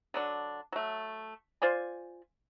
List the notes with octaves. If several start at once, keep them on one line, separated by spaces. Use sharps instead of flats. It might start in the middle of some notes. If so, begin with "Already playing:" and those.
D3 F#3 D4
F#3 A3
F4 C5 D5 G#5